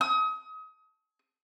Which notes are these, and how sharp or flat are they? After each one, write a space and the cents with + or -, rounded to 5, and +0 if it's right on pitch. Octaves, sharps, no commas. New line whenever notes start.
D#6 +35